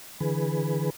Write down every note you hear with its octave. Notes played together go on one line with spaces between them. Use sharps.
D3 E3 G#4 B4